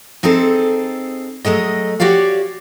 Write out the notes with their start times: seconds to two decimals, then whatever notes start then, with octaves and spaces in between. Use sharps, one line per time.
0.23 C4 D#4 G#4 A4 C5
1.45 F#3 G#3 A3 D#5
2.00 F#4 G4 C#5 D5 F5